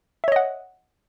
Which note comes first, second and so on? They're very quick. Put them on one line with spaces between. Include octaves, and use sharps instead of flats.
E5 C#5 D#5 F#5